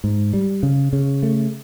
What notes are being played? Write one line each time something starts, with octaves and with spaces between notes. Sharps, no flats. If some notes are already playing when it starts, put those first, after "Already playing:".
G#2
G3
C#3
C#3
A3